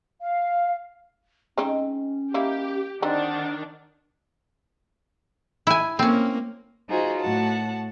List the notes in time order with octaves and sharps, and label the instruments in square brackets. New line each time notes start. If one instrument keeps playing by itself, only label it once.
[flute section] F5
[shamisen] G#3 C4 D#4 [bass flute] C#4
[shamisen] A#3 D#4 E4 [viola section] G4
[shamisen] D3 C4 D#4 [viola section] D#3 D4 [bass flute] F#5
[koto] E4 G#5
[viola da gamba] A#3 [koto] C4 C#4
[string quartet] D#4 F4 F#4 G#4 C5
A2 F#4 F#5 A5